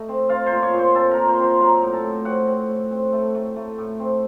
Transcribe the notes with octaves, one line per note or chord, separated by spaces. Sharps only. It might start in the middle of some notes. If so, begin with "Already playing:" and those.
Already playing: A3 D#5
C4
C4 F4 F5
C5 C6
A#2
C#5 C#6
A#2
C5 C6
C4 A4 A5
A#4 A#5
A#2
C5 C6
C4 C5 C6
F#3 A#4 A#5
A2
A4 A5
A2
C4 F#4 F#5
C4
A2
C4
A3
A3
A3
A2
C4